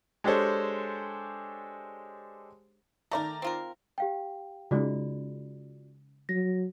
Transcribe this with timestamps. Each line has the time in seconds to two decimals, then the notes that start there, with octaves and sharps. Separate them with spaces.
0.24 G#3 D4 G4 A4 C5 C#5
3.11 D#3 A3 A#4 D5 A#5
3.42 C4 F4 A#4
3.98 G4 F5 G5
4.71 C#3 G#3 D#4 F4 F#4 D5
6.29 F#3 A#6